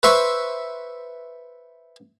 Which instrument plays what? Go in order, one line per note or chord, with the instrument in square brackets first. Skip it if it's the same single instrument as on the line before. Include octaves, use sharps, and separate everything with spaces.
[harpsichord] B4 C5 E5 C#6